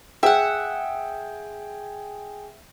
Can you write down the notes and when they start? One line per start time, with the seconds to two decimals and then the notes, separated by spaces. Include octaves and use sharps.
0.23 G#4 E5 F#5 G5